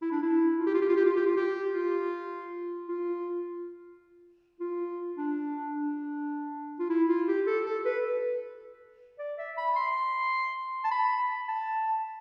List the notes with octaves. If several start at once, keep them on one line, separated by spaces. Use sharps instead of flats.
E4
D4
E4
F4
G4
F4
G4
F4
G4
F4
G4
F4
G4
F4
F4
F4
D4
D4
F4
E4
F4
G4
A4
A4
B4
D5
E5
B5
C6
A5
B5
A5